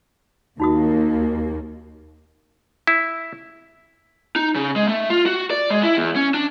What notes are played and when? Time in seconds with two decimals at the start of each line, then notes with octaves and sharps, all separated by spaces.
0.60 D#2 A#3 D#4 F#4 D#6
2.87 E4
4.36 D#4
4.55 C#3
4.76 G#3
4.88 A3
5.10 F4
5.26 F#4
5.50 D5
5.70 G#3
5.83 E4
5.97 E2
6.16 C#4
6.34 D4